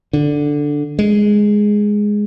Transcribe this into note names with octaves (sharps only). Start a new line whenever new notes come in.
D3
G#3